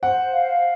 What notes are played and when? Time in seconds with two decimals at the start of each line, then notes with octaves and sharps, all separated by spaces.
0.03 C5 F#5
0.33 F5